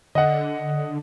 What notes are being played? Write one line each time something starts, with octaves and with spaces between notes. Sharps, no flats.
D3 D#5 F#5